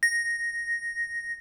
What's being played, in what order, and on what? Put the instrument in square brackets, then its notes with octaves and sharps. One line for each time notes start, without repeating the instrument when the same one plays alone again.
[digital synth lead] A#6